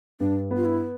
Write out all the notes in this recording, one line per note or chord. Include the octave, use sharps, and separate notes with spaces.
G2 D4
B3
F4
E4